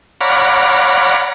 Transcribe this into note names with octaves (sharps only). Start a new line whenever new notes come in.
C#5 D5 F5 F#5 A#5 B5